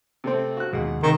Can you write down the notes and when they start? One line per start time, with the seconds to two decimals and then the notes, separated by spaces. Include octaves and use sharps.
0.24 C3 A3 C4
0.57 F#4 F#6
0.73 D#2 B2 G#3 F#5
1.03 C3 D#3